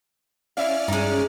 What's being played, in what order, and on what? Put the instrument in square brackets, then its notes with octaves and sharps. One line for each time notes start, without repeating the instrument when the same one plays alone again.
[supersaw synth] C#4 D5 F6 [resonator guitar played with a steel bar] E4 E5 F5
[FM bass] G2 [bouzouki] G#3 D#4